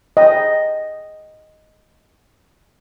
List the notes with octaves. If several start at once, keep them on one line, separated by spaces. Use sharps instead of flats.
D#5 G5